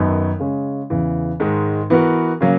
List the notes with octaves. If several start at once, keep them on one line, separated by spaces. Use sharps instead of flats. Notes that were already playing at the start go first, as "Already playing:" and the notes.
Already playing: F#2 D#3 F#3 B3 D#4
C#3 G#3 C#4
E2 C#3 E3
G#2 D#3 G#3
E3 B3 F#4 A#4
C#3 F#3 A#3 C#4